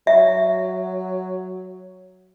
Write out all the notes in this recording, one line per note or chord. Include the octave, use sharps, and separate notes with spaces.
F#3 E5